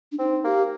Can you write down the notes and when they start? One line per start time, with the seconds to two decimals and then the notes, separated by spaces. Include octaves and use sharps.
0.12 D4
0.19 C4 D#4
0.44 A#3 G4